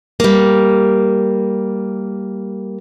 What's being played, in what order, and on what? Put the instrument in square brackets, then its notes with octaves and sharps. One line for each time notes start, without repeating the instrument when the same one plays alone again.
[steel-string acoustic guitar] G3 A#3